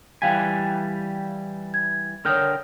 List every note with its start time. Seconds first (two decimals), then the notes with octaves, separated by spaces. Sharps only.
0.22 E3 G3 F5 G5 G#5 B6
1.74 G#6
2.25 D3 A#4 C#5 G5 D#6 F6